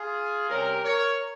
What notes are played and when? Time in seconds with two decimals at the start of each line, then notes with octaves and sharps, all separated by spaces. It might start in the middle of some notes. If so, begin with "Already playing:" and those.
Already playing: F4 G#4
0.48 C3 G3 C#4 G4 A#4
0.83 A#4 C#5